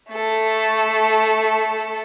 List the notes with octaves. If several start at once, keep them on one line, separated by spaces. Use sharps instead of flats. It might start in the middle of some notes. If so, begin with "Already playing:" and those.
A3 A4